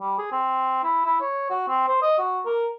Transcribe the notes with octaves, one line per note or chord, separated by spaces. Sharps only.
G3
G#4
C4
E4
E4
C#5
F#4
C4
C5
D#5
F#4
A#4